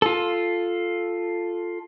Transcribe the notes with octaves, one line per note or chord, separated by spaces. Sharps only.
F4 A4